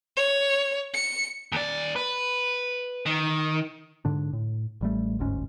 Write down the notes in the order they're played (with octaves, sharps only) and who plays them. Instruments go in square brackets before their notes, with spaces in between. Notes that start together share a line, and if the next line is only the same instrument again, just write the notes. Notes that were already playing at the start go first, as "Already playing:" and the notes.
[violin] C#5
C#7
[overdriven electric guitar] D#2 D5
B4
D#3
[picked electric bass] G#2 D3 D4
A2
A1 G3 A3
G1 D2 G#2 C#4